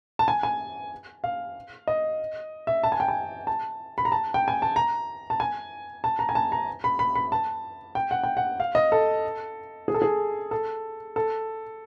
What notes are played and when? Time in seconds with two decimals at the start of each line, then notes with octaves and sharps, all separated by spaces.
0.19 A5
0.28 G#5
0.43 G#5
1.24 F5
1.87 D#5
2.67 E5
2.83 A5
2.92 G#5
3.00 G5
3.08 G#5
3.47 A5
3.98 B5
4.05 A#5
4.12 A5
4.34 G5
4.48 G#5
4.62 A5
4.76 A#5
5.30 A5
5.40 G#5
6.04 A5
6.19 A#5
6.29 G#5
6.35 A5
6.52 A#5
6.84 B5
6.99 B5
7.15 B5
7.32 A5
7.95 G5
8.11 F#5
8.23 G5
8.37 F#5
8.60 F5
8.75 D#5
8.92 A4
9.88 G#4
9.94 A4
10.02 G#4
10.51 A4
11.16 A4